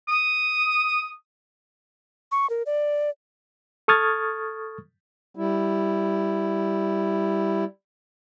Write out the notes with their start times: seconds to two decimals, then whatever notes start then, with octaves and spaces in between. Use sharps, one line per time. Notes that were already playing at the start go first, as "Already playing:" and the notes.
0.08 D#6
2.32 C#6
2.50 A#4
2.66 D5
3.88 A4 C#6 D#6 F6 G#6 A6
5.35 G3 E4